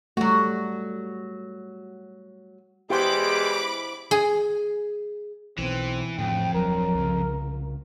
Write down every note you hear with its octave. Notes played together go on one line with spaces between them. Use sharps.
F#3 G3 A3 F#4
E2 G#3 E4 G4 C5 B5 D6
G#4
B1 B2 E3 C4
F2 A2 D3 F3 G5
D1 F#3 A#4
C2 C#3